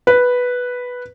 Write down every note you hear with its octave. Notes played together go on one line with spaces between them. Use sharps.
B4